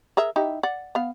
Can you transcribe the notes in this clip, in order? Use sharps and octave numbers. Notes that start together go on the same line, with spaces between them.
G#4 A#4 E5
D#4 E4 G4
D5 F#5
B3 F5